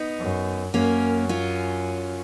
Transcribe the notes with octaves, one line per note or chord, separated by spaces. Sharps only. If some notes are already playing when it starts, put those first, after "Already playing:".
Already playing: B3 D#4
F#2
F#2 A#3 C#4
C#4 F4